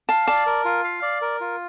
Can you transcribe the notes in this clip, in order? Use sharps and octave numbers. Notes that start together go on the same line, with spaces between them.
F5 A5
D5 A5
A#4
F4
F5
D5
A#4
F4